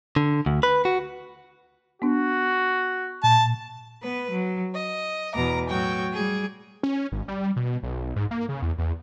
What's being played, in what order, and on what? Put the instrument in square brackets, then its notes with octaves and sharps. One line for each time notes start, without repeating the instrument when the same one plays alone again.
[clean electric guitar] D3
D2
B4
F#4
[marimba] B3 D4 [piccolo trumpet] F#4
[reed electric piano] A#2 [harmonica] A5
[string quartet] B3 B4
F#3
D#5
E2 B2 A#5 D6
A2 F#3 G5 C#6
G3 G#4
[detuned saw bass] C#4
G#1
G3
B2
B1
G#2
A#3
C#3
E2
E2